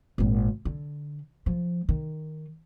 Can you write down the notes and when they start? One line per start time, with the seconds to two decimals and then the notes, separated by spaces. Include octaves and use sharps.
0.18 G#1 A#2
0.65 D3
1.46 F3
1.89 D#3